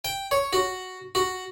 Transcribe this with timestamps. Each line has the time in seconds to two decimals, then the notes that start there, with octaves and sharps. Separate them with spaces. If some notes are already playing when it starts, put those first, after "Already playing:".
0.05 G5
0.31 C#5
0.53 F#4
1.15 F#4